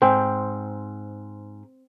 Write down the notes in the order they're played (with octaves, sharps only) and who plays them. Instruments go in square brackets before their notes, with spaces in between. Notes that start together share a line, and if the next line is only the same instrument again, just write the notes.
[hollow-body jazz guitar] G#2 [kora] C4